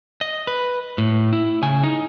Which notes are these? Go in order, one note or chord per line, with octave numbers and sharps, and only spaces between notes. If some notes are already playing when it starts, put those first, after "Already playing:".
D#5
B4
A2
E4
C#3 G#5
D#4